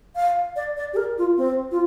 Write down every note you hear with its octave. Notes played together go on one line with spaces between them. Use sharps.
F5
D5
D5
G4
A#4
F4
C4
F4